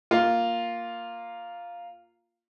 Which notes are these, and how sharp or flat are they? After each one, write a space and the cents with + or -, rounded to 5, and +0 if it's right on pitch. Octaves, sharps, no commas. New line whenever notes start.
A#3 +0 F4 +0